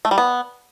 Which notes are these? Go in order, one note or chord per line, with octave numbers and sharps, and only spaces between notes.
A3
G3
B3